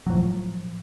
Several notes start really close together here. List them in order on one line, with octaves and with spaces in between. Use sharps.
F#3 F3 A2